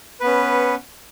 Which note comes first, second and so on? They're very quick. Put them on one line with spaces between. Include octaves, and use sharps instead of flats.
B4 B3 C#4